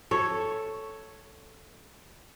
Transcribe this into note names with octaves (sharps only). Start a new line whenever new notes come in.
A4 C#5